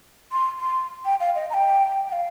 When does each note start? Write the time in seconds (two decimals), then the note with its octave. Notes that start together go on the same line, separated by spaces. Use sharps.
0.32 C6
0.59 C6
1.05 G5
1.20 F5
1.35 D#5
1.50 A#5
1.54 G5
2.09 G5
2.12 F5